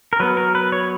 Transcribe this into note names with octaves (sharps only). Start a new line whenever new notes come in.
A#4
F#3 B3 B4
A#4
B4
C#5